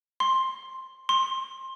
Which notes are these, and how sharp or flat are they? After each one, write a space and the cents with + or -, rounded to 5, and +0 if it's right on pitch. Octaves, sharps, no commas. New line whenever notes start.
C6 +5
C6 +20